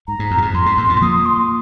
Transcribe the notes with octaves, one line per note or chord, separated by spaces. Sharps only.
G#2 A#5
G#2
F2
A#2
G#2
F2 C6
G#2
F2 A#2
F2 A#2
F3 A#3 D#6
C6